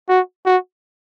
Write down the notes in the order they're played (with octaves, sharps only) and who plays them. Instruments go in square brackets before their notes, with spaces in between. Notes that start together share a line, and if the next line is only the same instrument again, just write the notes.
[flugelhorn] F#4
F#4